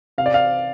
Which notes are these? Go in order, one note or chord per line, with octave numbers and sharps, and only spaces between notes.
C3 F5
D5
F5